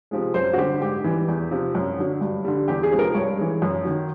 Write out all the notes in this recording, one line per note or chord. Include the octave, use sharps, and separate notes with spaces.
C3 F3 G#3
F#2 C5
F#4
D3 G3 G4
G#2 G4
E3 G3
E2
C3 F3
F#2
D3 F#3
G2
D3 G3
E2 G4
G#4
C3 F3 G#3
A#4
G2 C#5
E3 G#3
F#2
D#3 F#3